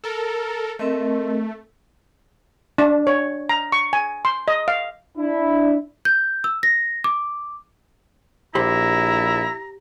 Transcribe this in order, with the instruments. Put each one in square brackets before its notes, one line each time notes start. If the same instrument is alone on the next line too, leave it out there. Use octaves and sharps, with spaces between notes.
[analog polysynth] A4 A#4
[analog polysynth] A3 [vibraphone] C4 A#4 D#5
[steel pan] D4
C#5
A#5
C#6
G#5
C6
D#5
F5
[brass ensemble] D4 E4
[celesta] G6
E6
A#6
D6
[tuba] A#1 [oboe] E4 [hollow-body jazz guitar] G4 C5 B5 [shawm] A#5